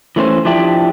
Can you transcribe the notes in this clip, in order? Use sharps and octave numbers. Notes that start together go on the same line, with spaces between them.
E3 A3 C#4 C5
F3 D4 E4 G4